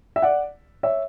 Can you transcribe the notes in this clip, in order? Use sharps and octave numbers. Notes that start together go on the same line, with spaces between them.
E5
D5 F#5
C#5 E5